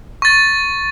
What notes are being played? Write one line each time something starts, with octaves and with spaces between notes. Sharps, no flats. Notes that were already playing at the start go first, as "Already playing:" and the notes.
C#6 A6